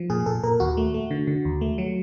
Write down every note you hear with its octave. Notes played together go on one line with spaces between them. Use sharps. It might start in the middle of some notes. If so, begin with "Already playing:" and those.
Already playing: F3
A#2 G#4
A#2 A4
A#2 A#4
D#2 F#4
A3
A3
D3
D3
D#2
A3
F#3